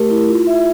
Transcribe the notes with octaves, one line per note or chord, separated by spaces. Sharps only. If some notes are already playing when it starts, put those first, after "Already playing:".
Already playing: A3 G4 A#4
E4
F4
E5